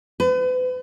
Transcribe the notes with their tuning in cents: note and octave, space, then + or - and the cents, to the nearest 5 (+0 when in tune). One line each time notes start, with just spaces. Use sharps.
B4 +40